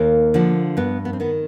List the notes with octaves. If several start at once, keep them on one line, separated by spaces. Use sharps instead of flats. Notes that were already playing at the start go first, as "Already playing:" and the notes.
Already playing: D#2 A#3
D3 F3
G2 B3
B3
C4
D#3 B3